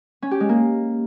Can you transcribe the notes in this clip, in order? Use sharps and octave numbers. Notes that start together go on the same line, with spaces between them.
C#4
G4
G#3
A#3